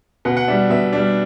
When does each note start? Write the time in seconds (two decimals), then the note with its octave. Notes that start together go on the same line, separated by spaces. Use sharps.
0.25 B2 F#5
0.37 F#5
0.48 G3 D4 E5
0.70 B2 E5
0.93 G3 D4